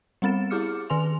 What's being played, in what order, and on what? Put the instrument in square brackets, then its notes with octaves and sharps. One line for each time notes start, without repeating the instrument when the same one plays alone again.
[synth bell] G3 B3 C4 A6 E7
E4 G4 G#4 D6 F6 C#7
D#3 B4 G#5 C6 F7